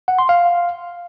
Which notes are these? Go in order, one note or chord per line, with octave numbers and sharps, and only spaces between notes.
F#5
C6
F5